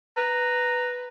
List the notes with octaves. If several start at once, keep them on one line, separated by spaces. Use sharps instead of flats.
B4 A#5